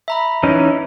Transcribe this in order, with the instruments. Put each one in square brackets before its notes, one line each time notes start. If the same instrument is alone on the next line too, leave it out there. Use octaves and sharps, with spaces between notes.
[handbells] E5 A#5 B5
[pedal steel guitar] E3 C#4 D#4